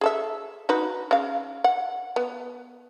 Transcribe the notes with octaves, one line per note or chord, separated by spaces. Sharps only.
G#4 A4 E5
D#4 F#4 B4
C#3 F5
F#5
B3